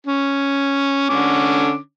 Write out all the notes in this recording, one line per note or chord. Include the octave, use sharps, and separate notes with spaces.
C#4
D3 C#4 D6